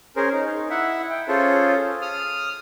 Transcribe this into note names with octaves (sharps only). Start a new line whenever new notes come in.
C#4 G#4 A#4 C5
D#4
E4 E5 F#5
G5
C#4 F4 G#4 A4 C5
D#6 F6